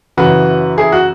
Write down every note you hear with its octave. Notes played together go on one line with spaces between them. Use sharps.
F#2 C#3 E3 F#4 B4
E4 G#4
F#4